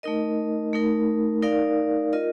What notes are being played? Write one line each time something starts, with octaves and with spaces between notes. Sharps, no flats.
A3 D#4 A#4 D#5
A3 D#4 A#4
D#4 A#4 D5 F5
F4 A#4 D#5